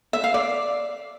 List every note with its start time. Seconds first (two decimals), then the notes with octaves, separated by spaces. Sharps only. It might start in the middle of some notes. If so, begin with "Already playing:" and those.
0.13 E5
0.24 F5
0.34 D5